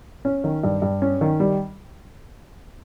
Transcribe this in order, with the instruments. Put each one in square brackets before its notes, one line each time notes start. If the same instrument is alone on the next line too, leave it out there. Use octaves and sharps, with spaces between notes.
[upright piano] C#4
D#3
G2
G2
C#4
D#3
G3